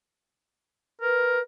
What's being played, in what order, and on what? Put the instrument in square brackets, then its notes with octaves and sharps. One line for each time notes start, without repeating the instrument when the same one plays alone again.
[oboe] A#4 [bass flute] B4